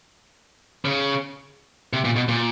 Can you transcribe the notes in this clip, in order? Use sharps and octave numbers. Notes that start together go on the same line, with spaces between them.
C#3
C3
A#2
B2
A#2